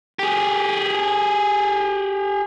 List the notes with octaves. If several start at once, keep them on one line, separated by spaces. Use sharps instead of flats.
G4 G#4